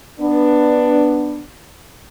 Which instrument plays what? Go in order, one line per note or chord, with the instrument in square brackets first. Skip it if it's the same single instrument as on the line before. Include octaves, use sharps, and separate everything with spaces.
[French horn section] B3 D4